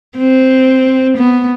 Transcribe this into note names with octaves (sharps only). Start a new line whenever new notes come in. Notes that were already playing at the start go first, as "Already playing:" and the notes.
C4
B3